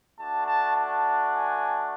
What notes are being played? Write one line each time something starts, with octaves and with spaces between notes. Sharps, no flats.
A3 D4 F#4 A5
A5
A5
G#5